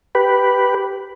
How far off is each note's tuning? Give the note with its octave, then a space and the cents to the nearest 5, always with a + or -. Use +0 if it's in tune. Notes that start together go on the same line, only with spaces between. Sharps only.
G4 -10 B4 +0